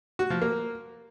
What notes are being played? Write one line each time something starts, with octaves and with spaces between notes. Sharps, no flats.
F#4
F3
A#3